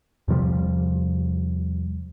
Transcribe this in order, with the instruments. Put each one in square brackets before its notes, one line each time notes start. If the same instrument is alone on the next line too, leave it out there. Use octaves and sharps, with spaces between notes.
[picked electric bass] E2 C3 F3 G3